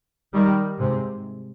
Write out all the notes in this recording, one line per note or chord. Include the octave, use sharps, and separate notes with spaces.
D#3 G3
G#2 C3